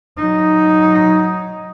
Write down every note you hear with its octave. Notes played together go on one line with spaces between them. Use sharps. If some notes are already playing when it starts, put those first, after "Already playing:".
F#3 D#4